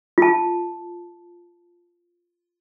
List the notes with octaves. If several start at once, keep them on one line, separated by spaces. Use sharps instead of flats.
F4 A5